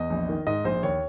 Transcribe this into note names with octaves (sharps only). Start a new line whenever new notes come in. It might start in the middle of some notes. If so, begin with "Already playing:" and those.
Already playing: E2 D#5
A#1
D#3
G#2 D#5
A#1 C5
D#2 C#5